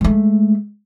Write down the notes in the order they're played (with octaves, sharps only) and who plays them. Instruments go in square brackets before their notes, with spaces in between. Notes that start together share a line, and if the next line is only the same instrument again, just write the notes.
[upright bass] G#3 A3